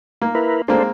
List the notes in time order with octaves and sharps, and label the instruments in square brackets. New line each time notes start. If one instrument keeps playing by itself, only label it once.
[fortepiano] A#3
[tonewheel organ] E4 A#4 B4
[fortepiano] G#3 A#3 C4 [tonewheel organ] D4 A4 C5